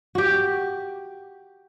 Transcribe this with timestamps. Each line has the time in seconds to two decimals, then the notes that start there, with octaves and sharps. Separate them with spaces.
0.15 F#4 G4